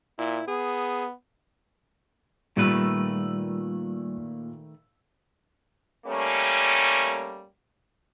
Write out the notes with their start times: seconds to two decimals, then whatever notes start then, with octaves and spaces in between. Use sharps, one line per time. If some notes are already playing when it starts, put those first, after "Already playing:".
0.18 A#2 E4
0.48 B3 G#4
2.57 A#2 D#3 G3 A3 B4 E6
6.06 G3 A3 A#3 C#4